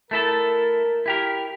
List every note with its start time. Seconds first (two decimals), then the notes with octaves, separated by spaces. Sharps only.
0.11 A3 E4 A4 A#4
1.06 E4 G4 A#4